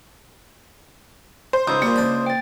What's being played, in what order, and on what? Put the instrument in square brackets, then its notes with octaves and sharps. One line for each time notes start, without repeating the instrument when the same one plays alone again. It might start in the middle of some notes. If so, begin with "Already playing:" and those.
[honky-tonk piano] C5
[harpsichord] C#2 G#2 [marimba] A#5 B5 E6 [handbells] C#6 D#6 G6
[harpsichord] A#2 G3 [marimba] A#3
[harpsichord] C#2 D4 B5
[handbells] G5 A6